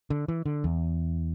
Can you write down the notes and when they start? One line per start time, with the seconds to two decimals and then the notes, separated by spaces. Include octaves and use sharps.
0.10 D3
0.28 E3
0.46 D3
0.64 E2